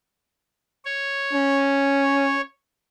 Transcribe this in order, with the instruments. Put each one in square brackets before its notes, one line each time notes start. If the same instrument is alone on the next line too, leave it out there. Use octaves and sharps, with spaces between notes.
[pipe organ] C#5
[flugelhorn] C#4